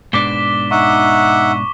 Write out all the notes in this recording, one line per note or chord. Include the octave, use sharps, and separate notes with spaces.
G#2 B2 D4 D6 B6 G7
D#4 E5 F#5 C#6